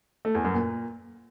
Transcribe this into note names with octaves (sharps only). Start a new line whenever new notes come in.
A3
E2
F#2
A#2